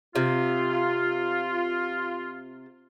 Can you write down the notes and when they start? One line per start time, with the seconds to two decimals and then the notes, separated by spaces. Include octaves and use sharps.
0.16 C3 F4